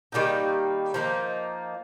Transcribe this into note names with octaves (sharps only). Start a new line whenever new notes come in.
D#3 G3 A#3 D#4
F3 A#3 D#4